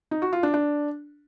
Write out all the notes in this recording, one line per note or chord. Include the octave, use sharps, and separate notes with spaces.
D#4
F#4
F4
D4
D4